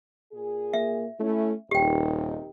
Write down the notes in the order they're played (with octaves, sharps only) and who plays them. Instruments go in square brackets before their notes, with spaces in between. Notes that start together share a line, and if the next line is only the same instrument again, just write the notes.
[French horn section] A#2 G#4
[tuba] A#3 [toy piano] E5
[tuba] A3 [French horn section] C#4 E4
[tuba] D#1 [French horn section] C3 D#3 D#4 [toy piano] G4 G5